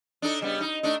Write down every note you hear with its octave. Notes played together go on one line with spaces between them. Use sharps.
D4 D#4 A4
C#3 G3 B3
D#4
A3 D4 D#4